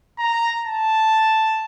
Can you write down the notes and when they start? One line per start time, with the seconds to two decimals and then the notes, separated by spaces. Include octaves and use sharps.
0.19 A#5
0.66 A5